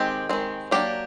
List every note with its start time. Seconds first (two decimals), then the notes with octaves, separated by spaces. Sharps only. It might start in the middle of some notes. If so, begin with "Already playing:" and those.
Already playing: D#3 G#3 C4 G4
0.29 D#3 G#3 C4
0.71 F#3 A#3 D4 G4